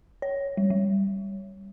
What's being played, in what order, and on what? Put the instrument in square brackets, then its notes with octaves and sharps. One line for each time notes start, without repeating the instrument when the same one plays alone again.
[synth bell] C#5
G3
G3